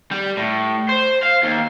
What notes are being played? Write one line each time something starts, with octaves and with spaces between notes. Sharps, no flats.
G3
A2
C5
F5
D#2